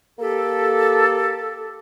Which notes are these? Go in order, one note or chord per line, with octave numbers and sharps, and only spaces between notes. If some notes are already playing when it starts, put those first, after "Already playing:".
A#3 G4 A4